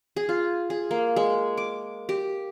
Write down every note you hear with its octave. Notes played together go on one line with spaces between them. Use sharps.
G#4
F4
G#4
A#3
G#3
D6
G4